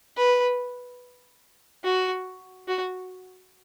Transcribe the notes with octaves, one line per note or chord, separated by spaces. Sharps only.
B4
F#4
F#4